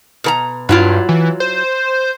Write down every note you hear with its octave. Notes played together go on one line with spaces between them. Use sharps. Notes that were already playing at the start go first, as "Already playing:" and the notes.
B2 A#4 A#5
G2 F#3 E4 F4
E3
C5